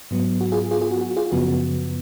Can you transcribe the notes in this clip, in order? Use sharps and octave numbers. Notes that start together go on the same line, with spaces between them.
G#2 F#3 B3
F#4
F4 G#4
F4 G#4
F4 G#4
F#4
F#4
F4 G#4
F#2 C#3 F3 B3 F#4